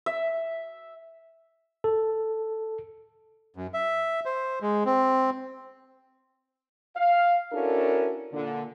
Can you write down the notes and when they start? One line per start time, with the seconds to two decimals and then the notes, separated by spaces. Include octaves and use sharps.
0.06 E5
1.84 A4
3.56 F#2
3.74 E5
4.25 C5
4.62 G#3
4.86 C4
6.96 F5
7.52 C#4 D4 E4 F#4 A4 A#4
8.33 A#2 D3